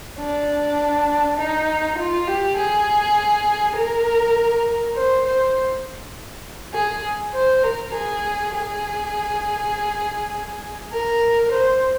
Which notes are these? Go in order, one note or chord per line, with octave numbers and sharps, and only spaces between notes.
D4
D#4
F4
G4
G#4
A#4
C5
C5
G#4
C5
A#4
G#4
G#4
A#4
C5